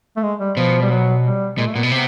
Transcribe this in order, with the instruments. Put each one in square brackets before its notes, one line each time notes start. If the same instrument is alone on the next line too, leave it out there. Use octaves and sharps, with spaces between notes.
[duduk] A3
G#3
G3
[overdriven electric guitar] B2 [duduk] F3
[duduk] G3
F#3
G3
[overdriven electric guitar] A#2 [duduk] G#3
[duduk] A3
[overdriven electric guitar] A#2 [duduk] B3
[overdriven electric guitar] B2
[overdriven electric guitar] C3 [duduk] B3